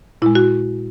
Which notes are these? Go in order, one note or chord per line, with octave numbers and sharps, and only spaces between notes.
A#2 G#3 E4
F#4